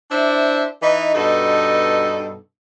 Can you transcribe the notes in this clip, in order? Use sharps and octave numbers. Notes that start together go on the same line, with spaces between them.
D4 E4 C5 D5 E5
E3 D#4
G2 B2 D#4 A4